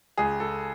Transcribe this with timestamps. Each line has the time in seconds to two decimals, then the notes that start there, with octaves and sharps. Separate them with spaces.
0.18 C#2 G#4
0.40 A4